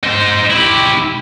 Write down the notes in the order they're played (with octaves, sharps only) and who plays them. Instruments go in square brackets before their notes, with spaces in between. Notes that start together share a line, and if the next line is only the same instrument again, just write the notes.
[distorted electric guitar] D#4 C5
E4 G4